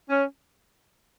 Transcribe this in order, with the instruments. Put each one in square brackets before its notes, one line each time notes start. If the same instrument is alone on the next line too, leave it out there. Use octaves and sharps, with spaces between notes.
[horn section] C#4